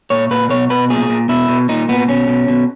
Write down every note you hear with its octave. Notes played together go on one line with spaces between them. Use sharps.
A#2 C#5
A#2 B4
B2 C#5
B2 B4
A#2 G#4
A#2
B2 E4
B2
A#2 D#4
A#2 B3
B2 C#4
B2
B2